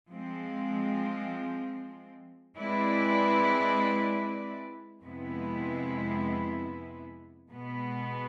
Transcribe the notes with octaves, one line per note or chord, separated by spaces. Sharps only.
F3 G#3 C4
G#3 C4 E4 B4 D5
F2 C3 G#3 B3 E4
B2 G#3 B3